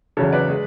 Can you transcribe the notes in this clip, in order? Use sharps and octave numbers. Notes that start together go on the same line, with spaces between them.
E2 C#3 F#3 A4 C#5
B4 D5
G#3